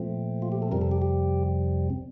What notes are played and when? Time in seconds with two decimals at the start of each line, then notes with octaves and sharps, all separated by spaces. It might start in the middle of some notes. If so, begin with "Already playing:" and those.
Already playing: A#2 F3 A3 C4
0.42 F4
0.52 G4
0.62 A4
0.72 F2 C3 G3 C4 A#4
0.82 A4
0.91 G4
1.02 G4